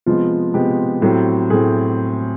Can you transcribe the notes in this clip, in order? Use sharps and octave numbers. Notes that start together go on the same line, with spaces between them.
C3 F3 G#3 B3 F4
C3 F3 G#3 B3 G4
A2 F#3 A3 C4
A2 F#3 A3 C4 G#4